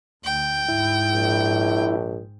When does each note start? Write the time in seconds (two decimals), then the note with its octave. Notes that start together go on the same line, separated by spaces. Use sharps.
0.24 D2 G5
0.68 G#2 E4
1.11 A#1